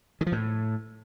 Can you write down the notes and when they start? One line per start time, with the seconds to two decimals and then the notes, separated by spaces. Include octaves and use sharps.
0.21 D#3
0.27 F3
0.32 A2